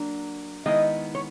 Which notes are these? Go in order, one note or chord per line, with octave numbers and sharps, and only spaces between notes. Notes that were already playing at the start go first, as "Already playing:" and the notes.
Already playing: F#3 A#3 D4
D#3 G#3 B3 E4 D#5
C#5